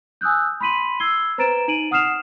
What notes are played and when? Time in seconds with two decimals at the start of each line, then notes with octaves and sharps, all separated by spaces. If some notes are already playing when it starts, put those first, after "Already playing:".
0.21 G#5 D#6 E6 F#6 G6
0.60 B5 C6 B6 D#7 F#7
1.00 E6 G#6 C7 G7
1.38 B4 C5 A#5 A6 D7 E7
1.68 D#4 D7 D#7 F#7
1.91 F#5 D#6 F6 C7 E7 F7